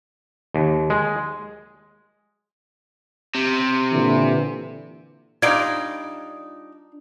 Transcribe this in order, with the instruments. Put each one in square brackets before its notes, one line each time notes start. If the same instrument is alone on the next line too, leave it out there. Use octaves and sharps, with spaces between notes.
[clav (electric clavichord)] D#2
G#3
[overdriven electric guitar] C3
[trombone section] A#2 D3 E3
[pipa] G3 D#4 [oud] D4 F4 D5 [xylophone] G#6 D7